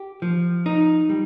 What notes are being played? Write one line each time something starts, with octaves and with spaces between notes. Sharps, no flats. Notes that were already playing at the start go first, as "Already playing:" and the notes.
Already playing: G4
F3
D#4
G3